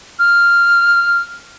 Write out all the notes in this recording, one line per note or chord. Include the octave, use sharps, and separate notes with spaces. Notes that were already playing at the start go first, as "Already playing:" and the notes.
F6